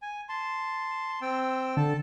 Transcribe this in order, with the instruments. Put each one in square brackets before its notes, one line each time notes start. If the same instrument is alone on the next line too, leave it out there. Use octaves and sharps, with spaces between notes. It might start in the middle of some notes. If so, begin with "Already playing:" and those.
[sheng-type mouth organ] G#5
A5 C6
C4 G5 E6
[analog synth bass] D3 [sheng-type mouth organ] A4 A5